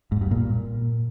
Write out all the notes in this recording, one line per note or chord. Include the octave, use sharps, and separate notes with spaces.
G#2
G2
A#2